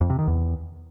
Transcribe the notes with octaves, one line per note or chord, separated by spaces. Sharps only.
F2
C3
D#3
E2